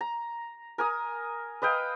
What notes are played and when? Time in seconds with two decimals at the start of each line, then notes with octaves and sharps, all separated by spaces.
0.01 A#5
0.78 A#4 G#5 D#6
1.62 B4 D#5 F5 G5